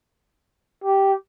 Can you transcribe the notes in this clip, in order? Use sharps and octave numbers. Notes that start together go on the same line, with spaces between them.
G4